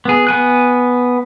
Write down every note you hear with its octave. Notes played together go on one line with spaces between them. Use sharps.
B3 G#4
B3 G#5 F#6